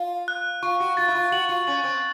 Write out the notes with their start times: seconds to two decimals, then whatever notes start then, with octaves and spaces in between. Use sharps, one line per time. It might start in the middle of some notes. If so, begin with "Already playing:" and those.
Already playing: F4
0.28 F#6
0.62 F4 C#6
0.80 F#4
0.97 F4 A6
1.08 E4
1.15 F4
1.32 F#4 F#7
1.49 F4
1.67 C#4 F#7
1.84 C4